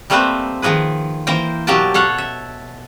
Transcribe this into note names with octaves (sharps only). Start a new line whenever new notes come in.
G3 A3 A#3 C4 B4 C5
D#3 F3 A#3 G#4 B4
E3 A#3 A#4 C5 G5
B2 F#3 A#3 G4 G5 A5
A4 C#5 F5 F#5
E5